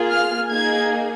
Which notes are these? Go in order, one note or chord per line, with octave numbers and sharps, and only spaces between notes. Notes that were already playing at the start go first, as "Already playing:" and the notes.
Already playing: A#3 F4 G#4
F6
A#3 D#4 G#4 G#6